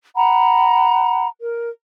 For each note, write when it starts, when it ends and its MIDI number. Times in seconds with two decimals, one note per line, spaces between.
0.15 1.27 78
0.15 1.27 82
0.15 1.27 83
1.40 1.70 70